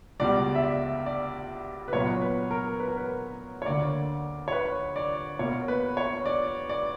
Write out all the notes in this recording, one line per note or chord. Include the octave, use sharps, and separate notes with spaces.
C#2 B2 G3 D5
E5
D5
D5
B4
A#2 F#3 B3 C#5
B4
A#4
B4
A#4
B4
C#5
D2 D3 A#3 D5
C#5
B4
D5
B2 A#3 C#5
B4
C#5
D5
D5